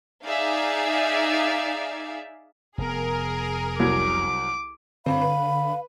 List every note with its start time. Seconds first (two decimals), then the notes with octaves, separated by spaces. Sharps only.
0.24 D#4 G#4 D5 E5 F5
2.78 F1 B3 G#4 A#4
3.80 C2 F#3 D6 G#6
5.06 G1 D3 C4 F5 B5
5.22 B4